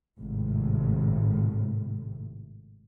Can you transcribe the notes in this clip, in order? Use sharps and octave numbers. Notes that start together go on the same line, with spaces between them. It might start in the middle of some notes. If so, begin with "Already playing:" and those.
G#1 A2 C3